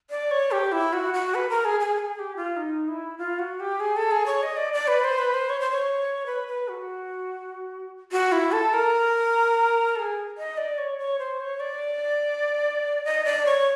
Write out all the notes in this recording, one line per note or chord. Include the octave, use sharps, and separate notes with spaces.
D5
C#5
G4
E4
F#4
F#4
B4
A#4
G#4
G#4
A4
G#4
G#4
G4
F4
D#4
E4
F4
F#4
G4
G#4
A4
G#4
C#5
D#5
D5
D5
B4
C5
B4
C5
C#5
C5
C#5
B4
B4
F#4
F#4
E4
A4
A#4
A4
G#4
D#5
D5
C#5
C#5
C5
C#5
D5
D#5
D5
C#5